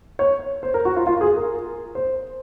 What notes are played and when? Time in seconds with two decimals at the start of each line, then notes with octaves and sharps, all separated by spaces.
0.19 C#5
0.63 C5
0.74 A#4
0.85 F#4
0.96 F4
1.07 F4
1.21 G#4
1.36 A#4
1.95 C5